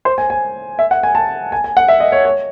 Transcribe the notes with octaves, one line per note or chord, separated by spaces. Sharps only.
C5
G#5
G#5
E5
F#5
G#5
A5
G#5
G#5
F#5
E5
D#5
C#5
C#5